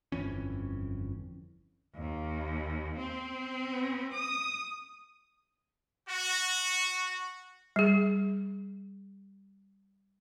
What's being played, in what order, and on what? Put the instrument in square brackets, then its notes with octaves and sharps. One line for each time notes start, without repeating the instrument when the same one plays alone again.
[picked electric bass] G1 F2 E3 C#4
[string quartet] D#2
C4
D#6
[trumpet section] F#4
[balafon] G3 G#4